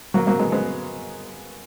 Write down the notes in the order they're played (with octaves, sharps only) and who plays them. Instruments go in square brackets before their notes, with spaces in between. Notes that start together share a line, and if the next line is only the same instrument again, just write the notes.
[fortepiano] F#3 A#3
F#3 A#3
G#3 B3
G#3 B3